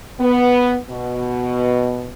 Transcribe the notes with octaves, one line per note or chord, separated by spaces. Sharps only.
B3
B2